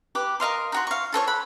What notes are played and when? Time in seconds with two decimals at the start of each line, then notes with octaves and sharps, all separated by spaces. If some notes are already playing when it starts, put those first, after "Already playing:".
0.15 G4 B4 D6
0.40 A#4 D#5 F5 C6
0.72 D#4 F#4 C6
0.87 F5 C#6
1.12 F4 A4 C5 C#5
1.27 F#5 B5